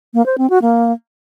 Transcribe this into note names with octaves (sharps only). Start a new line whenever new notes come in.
A#3
C5
C4
F#4
A#3